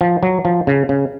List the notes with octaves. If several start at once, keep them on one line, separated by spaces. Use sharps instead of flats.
F3
F#3
F3
C#3
C#3